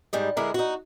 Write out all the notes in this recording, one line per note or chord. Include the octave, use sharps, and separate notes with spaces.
G#2 G3 D#5
D3 G#3 E4 A#4
D#4 F#4